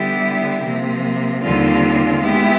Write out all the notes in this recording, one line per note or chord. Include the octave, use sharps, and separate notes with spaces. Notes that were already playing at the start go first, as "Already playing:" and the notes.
Already playing: D3 G3 B3 E4 G4
C3 F3 A#3
D#2 D3 G3 C4 F4
G#3 B3 E4 G4